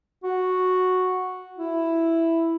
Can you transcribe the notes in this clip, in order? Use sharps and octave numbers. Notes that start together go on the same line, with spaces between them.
F#4
E4